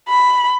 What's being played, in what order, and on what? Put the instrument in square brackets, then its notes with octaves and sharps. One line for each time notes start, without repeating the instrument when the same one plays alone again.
[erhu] B5